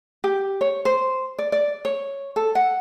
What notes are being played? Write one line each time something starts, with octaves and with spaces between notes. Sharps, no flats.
G4
C#5
C5
D5
D5
C#5
A4
F#5